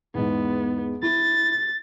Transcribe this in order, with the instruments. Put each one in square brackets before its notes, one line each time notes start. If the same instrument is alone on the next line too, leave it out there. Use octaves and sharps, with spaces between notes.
[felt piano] E2 G#2 [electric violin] B3
[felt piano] E4 [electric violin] A6